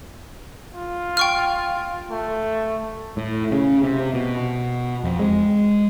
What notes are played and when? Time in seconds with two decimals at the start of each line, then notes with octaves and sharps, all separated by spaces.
0.74 F4
1.17 G5 C#6 F6
2.10 A3
3.17 A2
3.52 C#3
3.83 C3
4.14 B2
5.04 F2
5.19 G#3